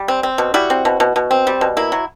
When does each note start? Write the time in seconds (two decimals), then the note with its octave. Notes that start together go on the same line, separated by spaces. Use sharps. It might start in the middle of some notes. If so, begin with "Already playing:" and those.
Already playing: G3
0.08 C4
0.23 C4
0.38 B2
0.54 G3 E4 F#4
0.70 C4
0.85 B2
1.00 B2
1.16 B2
1.31 C4
1.47 G3
1.61 B2
1.77 A#3 E4
1.92 F#3